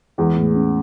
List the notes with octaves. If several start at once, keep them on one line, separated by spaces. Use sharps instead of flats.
E2 G#3
A2
C#4